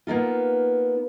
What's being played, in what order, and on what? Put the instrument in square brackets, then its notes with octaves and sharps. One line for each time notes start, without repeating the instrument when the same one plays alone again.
[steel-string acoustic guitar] A#3 B3 D#4 F4